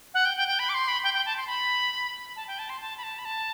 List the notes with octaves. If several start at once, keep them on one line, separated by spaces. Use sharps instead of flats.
F#5
G5
G5
G5
B5
D6
C6
B5
G5
G5
A5
C6
B5
A5
G5
A5
C6
A5
B5
A5
B5
A5